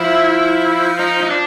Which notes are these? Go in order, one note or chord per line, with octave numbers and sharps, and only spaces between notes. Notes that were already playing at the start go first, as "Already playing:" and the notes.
Already playing: F3 E4
D#4
D#4
D4